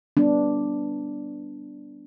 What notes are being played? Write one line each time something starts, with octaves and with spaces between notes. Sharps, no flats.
G3 B3 D4